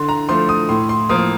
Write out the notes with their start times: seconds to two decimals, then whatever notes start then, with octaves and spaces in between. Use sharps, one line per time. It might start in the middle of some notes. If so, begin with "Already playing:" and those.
Already playing: D3 C6
0.09 A#5
0.29 F3 A3 C6
0.49 D#6
0.69 A2 C6
0.89 C6
1.09 F3 A#3 D#6